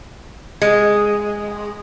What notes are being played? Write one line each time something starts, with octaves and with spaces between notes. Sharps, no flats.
G#3